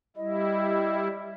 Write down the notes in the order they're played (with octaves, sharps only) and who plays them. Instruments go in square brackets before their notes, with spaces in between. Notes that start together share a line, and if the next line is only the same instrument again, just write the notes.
[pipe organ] G3 E4 [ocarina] D#5